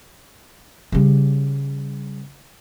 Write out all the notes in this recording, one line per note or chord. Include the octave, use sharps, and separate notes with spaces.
C#3 G3